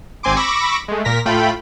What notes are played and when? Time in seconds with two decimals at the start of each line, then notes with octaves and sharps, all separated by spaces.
0.23 G#1 C4 G#5 C6 D6
0.36 B5 C#6 D6 E6 A#6
0.88 G#3 A3
1.05 A#2 A#4 A#6 B6
1.25 A2 A3 F4 G5 B5